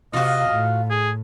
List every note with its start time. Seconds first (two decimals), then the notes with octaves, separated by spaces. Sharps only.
0.13 C3 F4 F#4 D#5
0.50 A2
0.90 G#4